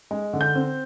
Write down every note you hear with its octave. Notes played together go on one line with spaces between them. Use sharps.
G#3
D3
G6
C4